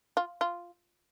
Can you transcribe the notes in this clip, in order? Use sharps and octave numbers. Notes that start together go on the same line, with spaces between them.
F4
F4